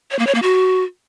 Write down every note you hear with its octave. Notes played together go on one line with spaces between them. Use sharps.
C#5
A#3
C#5
A#3
F#4